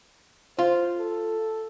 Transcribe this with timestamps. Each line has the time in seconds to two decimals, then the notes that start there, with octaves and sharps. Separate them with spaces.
0.59 F4 C5
0.98 A4